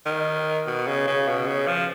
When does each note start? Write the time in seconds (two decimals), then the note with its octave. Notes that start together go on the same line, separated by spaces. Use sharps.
0.06 D#3
0.66 B2
0.87 C#3
1.07 C#3
1.28 B2
1.47 C#3
1.67 F3